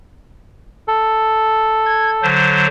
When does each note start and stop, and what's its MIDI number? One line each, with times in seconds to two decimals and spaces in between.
0.88 2.27 69
1.86 2.10 92
2.23 2.67 50
2.23 2.67 54
2.23 2.67 72